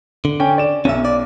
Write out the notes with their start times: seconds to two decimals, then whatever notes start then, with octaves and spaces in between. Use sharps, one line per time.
0.25 D3
0.40 C#4 G5
0.58 D5 E7
0.85 B1 C#4 E5
1.05 D5